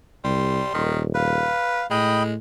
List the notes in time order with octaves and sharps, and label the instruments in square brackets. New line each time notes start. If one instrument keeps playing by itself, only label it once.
[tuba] C2 [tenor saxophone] G3 [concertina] C6
[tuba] D#1 [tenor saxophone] D#3
[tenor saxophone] B4 [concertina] F5
[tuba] A2 [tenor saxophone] G#3 [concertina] D#5 G5 B5